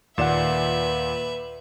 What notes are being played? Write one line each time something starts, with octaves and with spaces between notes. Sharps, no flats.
D#2 A#2 B4 D5 E5 F#5 E7